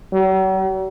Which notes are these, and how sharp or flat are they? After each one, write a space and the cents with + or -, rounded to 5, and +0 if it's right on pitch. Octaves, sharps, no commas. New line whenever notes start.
F#3 +45